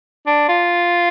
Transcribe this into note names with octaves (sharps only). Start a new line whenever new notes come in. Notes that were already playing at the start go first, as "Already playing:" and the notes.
D4
F4